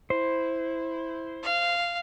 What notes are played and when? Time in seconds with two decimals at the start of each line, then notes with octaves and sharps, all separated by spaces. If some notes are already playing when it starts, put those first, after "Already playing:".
0.10 E4 C5
1.43 F5